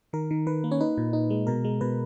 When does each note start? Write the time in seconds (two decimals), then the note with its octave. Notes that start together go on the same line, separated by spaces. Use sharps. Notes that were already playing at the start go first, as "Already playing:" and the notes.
0.13 D#3 A#4
0.31 D#3
0.47 D#3 B4
0.64 A#3
0.71 C#4 C#5
0.81 D#4 B4
0.98 A#2
1.13 D#4
1.30 G#3
1.47 B2 A#4
1.64 G#3
1.81 B2 B4